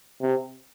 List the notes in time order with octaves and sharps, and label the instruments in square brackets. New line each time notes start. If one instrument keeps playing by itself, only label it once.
[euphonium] C3